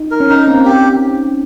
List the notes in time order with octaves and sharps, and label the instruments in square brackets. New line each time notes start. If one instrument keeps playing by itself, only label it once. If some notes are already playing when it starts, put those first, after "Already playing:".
Already playing: [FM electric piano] D#4
[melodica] A#4
[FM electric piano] C#4
[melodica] D#4
[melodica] A#3 [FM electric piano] C4
[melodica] G4